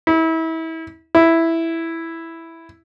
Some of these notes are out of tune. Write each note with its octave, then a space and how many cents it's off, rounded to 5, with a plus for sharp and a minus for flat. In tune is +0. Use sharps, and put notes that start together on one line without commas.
E4 -30
E4 +0